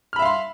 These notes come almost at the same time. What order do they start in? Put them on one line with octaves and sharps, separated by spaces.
F6 B5 E5 F5 C6